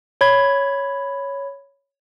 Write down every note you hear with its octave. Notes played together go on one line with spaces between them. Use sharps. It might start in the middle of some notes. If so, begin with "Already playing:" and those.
C#5 B5 G#6